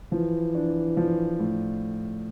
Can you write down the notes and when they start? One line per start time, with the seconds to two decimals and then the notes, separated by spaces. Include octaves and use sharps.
0.12 E3 F3
0.55 D4
0.97 F3
1.39 A2